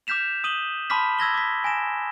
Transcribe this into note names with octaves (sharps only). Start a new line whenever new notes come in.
D6 F6 G6 B6 E7 F7
D#6 D#7 F#7 G7
A5 B5 C6 D6 F6 B6
E6 G#6 A#6 G7
D6 B6
G#5 A#6 E7